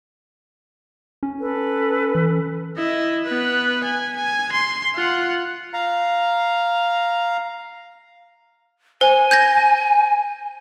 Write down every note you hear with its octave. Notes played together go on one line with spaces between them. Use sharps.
C#4
A4 B4
E3
E4 D#5
B3 B4
G#5
G#5
C6
F4 F#5
F5 A#5
C5 G#5
G6 G#6 A#6